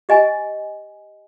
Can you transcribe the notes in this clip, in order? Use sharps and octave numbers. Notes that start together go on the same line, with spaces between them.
G4 D#5 G#5